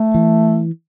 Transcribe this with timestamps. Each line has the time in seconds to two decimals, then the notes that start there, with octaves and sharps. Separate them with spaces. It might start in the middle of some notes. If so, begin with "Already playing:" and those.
Already playing: A3
0.14 E3